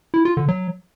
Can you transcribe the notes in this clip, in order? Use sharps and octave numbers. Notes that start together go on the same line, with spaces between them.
E4
F4
D3
F#3